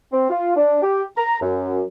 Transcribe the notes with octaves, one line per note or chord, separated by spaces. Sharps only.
C4
F4
D4
G4
A#5
F#2